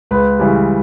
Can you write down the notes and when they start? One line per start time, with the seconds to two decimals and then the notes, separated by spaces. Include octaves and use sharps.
0.11 C#2 B4
0.39 C#3 E3 G3